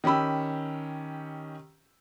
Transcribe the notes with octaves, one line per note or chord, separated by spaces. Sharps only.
D#3 C#4 G4 B5 E6